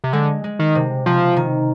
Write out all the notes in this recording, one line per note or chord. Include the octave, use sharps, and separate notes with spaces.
C3
D3 G#3
G#3
D#3
C3
C3 F3
D#3